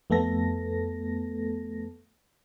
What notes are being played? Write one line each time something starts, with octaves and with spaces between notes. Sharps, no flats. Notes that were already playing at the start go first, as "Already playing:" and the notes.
F2 A3 B3 A4 A#6